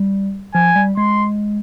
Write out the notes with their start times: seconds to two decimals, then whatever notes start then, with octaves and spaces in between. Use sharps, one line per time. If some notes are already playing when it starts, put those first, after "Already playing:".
Already playing: G3
0.55 F3 G#5
0.76 G3
0.97 G#3 C6